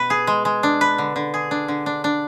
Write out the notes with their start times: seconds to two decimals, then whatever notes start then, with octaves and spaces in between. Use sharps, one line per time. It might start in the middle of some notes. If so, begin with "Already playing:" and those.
Already playing: B2 B4
0.10 G#4
0.27 G#3
0.45 G#3
0.63 D4
0.81 B4
0.98 D3
1.16 D3
1.34 G#4
1.51 D4
1.68 D3
1.86 D4
2.04 D4